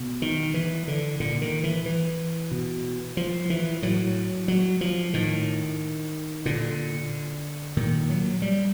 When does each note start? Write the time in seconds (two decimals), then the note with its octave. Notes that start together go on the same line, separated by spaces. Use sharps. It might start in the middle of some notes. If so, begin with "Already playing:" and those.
Already playing: B2
0.22 D#3
0.54 E3
0.88 D3
1.20 A#2 D3
1.42 D#3
1.64 E3
1.86 E3
2.51 B2
3.17 F3
3.50 E3
3.82 A2 F#3
4.48 F#3
4.81 F3
5.14 A2 D#3
6.45 A#2 D3
7.77 A#2 D#3
8.10 F#3
8.42 G3